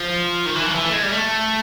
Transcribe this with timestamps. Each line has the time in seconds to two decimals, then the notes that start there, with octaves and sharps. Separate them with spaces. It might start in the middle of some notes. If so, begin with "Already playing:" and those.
Already playing: F3
0.46 D#3
0.56 E3
0.65 F3
0.75 E3
0.84 A3
0.93 G#3
1.03 G3
1.12 A3